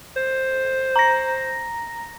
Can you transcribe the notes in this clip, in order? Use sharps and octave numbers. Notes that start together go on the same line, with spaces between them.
C5
A#5 A#6